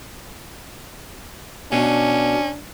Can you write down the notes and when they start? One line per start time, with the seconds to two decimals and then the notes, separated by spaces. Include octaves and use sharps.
1.72 B2 C#4 D4